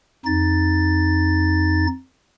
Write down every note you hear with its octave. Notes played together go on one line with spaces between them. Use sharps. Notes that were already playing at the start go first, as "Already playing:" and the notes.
F2 D#4 A6